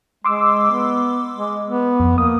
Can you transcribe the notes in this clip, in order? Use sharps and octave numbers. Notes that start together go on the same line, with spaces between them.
G#3 C6 D6 E6
B3
G#3
B3
F2
A#3 D#6